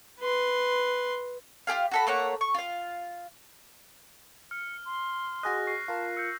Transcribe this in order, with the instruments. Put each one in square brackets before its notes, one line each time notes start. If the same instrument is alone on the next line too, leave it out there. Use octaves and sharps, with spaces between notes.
[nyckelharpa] B4 C6
[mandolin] F4 G4 G#4 F5
F#4 A4 B5
A3 A#3 C#5 F#5
C#6
F4 F5
[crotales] F6 [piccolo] C#7
[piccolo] C6
[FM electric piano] F#4 G#4 D#5 [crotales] F#6 A#6
[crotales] C#6 C7
[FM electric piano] F4 A#4 F5 [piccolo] A5
[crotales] E6 G6 [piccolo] C#7